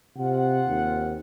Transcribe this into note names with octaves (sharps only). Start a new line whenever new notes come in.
C3 C4 F4 F#5
D#2